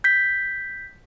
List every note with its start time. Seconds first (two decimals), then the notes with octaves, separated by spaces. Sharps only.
0.04 G6 B6